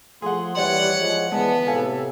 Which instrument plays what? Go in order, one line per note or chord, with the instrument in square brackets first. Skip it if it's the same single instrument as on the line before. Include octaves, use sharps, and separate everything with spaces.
[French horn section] F3 A3 [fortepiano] G#4 F#5 [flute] C6
[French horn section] D#2 E3 G3 [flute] C#5 [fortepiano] D5 [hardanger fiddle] F#5
[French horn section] F3 G#3
[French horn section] D3 E3 G#4 [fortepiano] G#3 [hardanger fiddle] B3 [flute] A5
[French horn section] A2 C3 [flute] A4 [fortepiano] F5 G#5